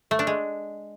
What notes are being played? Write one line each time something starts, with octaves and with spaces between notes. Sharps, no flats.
A3
D4
G#3